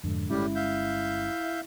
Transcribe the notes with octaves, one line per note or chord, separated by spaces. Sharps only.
F2 G#2 D3
G1 A2 G3 G#3 C#4 E4 G4
E5 F5 G6